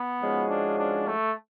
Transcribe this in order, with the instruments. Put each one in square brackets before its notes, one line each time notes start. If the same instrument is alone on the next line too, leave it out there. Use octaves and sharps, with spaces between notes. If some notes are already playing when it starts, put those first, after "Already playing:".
Already playing: [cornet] B3
[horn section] G#2 F3 G#3 C#4 F#4
[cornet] D4
D4
A3